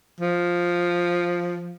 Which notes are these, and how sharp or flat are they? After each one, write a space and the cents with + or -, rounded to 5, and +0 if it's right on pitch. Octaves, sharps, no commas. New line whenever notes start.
F3 +5